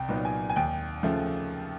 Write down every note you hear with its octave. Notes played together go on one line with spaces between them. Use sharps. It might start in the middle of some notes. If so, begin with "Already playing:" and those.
Already playing: C2 G5
A#2 F#3 B3 D#4
G#5
G#5
D#2 G5
C#3 F3 A3